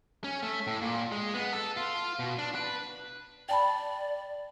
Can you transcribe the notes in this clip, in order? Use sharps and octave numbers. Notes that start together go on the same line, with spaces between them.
C#4
A3
A2
A#2
G#3
B3
A4
F4
B2
D4
B4
D5 G5 A5 B5